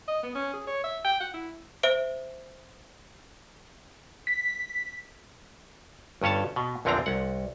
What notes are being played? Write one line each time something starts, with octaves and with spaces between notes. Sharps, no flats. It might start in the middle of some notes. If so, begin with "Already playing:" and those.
D#5
B3
C#4
G#4
C#5
E5
G5
F#5
E4
C5 E5 D7
B6
G1 G2 C#4 C#5 A5
B2
A#1 E2 D3 C4 D4 A#5
C2 F#5